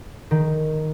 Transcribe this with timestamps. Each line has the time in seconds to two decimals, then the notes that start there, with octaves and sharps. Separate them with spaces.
0.31 D#3